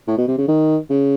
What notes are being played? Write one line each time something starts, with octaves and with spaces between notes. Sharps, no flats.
A2
B2
C3
C#3
D#3
C#3